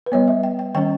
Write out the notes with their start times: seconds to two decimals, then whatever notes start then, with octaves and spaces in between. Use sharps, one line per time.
0.06 B4
0.12 G3 B3 C#5
0.28 E5
0.43 G5
0.59 G5
0.75 D#3 G3 C#4 G5